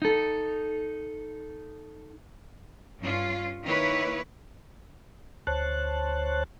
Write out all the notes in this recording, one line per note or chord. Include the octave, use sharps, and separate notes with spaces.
D#4 A4
G2 C#4 F4
D#3 A#3 E4 B4 C#5
D2 C5 C#5 A5 F#6